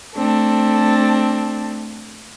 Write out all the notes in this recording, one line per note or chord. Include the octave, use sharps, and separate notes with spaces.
A3 C4 D4 A4